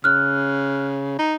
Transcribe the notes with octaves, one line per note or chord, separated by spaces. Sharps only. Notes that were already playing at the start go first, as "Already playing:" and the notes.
C#3 F6 F#6
D#4